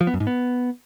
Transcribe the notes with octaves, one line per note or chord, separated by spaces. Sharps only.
F3
B3
F#2
G#2
B3